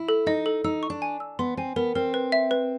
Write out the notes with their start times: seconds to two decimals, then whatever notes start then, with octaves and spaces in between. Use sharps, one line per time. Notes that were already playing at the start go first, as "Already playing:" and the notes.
Already playing: E4
0.09 A4
0.26 D#4 D#5
0.46 A4
0.64 D#4 E6
0.83 C#6
0.90 D4
1.02 G#5
1.20 E6
1.39 B3 C6
1.57 C4 G#5
1.76 B3 A#4
1.95 C4 A#4
2.14 B4
2.32 E5
2.51 B4